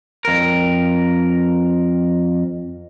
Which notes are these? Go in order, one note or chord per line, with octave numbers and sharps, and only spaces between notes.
F2 A#4